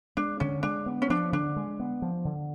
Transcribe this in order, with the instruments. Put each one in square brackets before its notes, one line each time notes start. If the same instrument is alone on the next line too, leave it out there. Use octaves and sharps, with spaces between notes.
[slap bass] G#3 [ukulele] D4
[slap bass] D3 [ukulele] C#4
[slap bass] G#3 [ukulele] D4
[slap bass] B3
[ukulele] C#4
[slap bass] F3 [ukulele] D4
[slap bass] D3 [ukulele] D4
[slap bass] G#3
B3
F3
D3